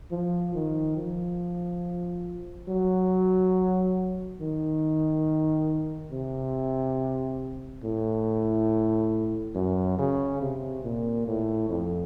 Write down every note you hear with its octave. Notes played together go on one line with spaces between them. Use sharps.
F3
D#3
F3
F#3
D#3
C3
A2
F#2
C#3
C3
A#2
A2
F2